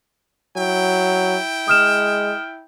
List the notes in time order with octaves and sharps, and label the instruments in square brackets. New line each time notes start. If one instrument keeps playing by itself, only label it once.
[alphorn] F#3 [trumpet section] E4 G5
[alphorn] G#3 [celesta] D#6 F6 E7